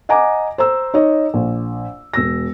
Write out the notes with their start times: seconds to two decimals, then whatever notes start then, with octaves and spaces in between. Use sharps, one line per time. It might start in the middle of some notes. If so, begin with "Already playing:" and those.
0.09 D#5 F#5 G#5 A#5 D6
0.58 C5 A#5 E6
0.94 D#4 C#5 D#5
1.34 A#1
2.14 E1 E6 A#6